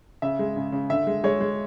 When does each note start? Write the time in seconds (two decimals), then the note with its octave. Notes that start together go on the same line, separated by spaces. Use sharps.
0.22 C#3 E5
0.39 G#3
0.56 C#3
0.72 C#3
0.90 D3 E5
1.07 G#3
1.24 G#3 C#5
1.41 G#3